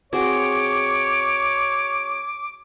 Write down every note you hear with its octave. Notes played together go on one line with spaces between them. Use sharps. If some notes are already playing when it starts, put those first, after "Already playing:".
C4 F#4 G#4 C#5 D6